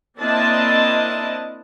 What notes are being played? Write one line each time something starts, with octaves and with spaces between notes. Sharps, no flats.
A#3 C4 D4 E4 D#5 A5